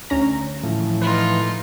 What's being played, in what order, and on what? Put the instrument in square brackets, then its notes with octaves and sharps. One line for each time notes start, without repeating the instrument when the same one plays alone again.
[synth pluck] D2 C#4 A#5
[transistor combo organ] A2 E3 F3
[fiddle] D#4 F4 [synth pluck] B4